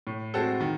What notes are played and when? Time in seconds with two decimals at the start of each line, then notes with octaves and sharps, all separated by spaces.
0.07 A2
0.34 G#3 C4 F#4 A4
0.60 D#3